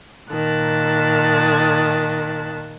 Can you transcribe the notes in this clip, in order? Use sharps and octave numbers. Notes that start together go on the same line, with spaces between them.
A#2 D#3 A5 F#6